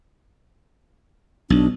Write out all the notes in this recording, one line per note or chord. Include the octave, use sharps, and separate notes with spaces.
B1 D4